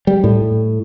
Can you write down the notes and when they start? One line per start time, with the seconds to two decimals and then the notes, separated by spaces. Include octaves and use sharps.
0.07 G3
0.24 A2